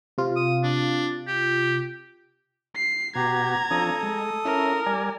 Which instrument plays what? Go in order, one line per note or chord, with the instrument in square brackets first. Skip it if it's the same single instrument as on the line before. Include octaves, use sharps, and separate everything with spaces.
[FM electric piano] C3 F4
[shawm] D#6
D4
G4
[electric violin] C7
[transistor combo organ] B2 F#4 [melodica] G4 [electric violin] A#5 G#6
[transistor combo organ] F3 C4 D4 [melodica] A4 D#6
[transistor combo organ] G#3
[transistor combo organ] C#4 E4 [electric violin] A#4
[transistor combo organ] G3 D5 G#5